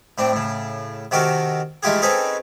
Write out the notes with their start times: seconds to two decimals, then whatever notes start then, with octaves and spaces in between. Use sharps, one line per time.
0.18 A2 C4 D4
0.32 A2 C#3
1.11 C3 D#3 F#4 G4 A4 A#4
1.83 E3 G#3 A3 F4 G4 G#4
2.02 C4 C#4 D#4 G#4 A4 B4